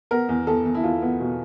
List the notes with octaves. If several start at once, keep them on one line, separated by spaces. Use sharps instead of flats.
B3 A#4
E2
E2 A4
E2
E4
E2 F4
B3
B2